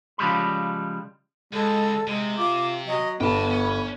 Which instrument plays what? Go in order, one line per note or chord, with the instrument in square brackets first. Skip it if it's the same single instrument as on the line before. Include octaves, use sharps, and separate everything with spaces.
[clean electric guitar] C#3 F3 G3 G#3 B5
[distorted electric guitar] C#2 [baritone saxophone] G#3 [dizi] A4
[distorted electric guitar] C3 [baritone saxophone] G#3
[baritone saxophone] F4 [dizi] D6
[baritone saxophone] F#3 [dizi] D#5
[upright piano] G1 [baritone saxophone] B3 [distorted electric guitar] G5 A5 [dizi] B5
[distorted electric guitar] C#4